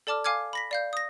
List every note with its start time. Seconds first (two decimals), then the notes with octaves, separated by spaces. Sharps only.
0.07 A4 D5 A5 D6 F6
0.24 F5 G#5 D6 F6 G#6
0.53 B5 A#6 B6
0.71 D5 F5 G6
0.93 D#6 A#6